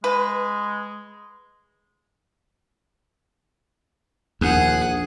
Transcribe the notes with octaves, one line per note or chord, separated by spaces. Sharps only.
G#3 B4
A#1 D#2 G#4 F#5